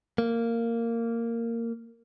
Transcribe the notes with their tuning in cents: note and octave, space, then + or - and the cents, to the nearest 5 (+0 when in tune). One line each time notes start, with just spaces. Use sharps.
A#3 -15